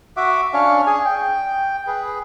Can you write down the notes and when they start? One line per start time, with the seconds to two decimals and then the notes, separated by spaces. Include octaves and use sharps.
0.17 F#4 E5 F#5 D6
0.53 C#4 D4 C#5 F5
0.87 G#4 G#5
1.05 G5
1.87 G#4 B4